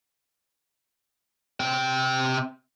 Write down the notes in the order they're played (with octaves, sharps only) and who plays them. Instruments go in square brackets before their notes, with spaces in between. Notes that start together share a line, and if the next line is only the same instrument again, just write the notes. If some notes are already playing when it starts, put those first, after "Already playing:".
[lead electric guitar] C3 G5